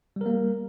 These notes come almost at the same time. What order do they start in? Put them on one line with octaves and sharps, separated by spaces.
G3 A#4 A#3